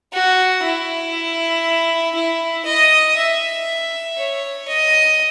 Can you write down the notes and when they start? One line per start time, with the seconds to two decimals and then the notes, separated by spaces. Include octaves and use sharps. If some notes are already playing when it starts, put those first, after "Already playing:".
0.13 F#4
0.63 E4
2.15 E4
2.65 D#5
3.17 E5
4.17 C#5
4.68 D#5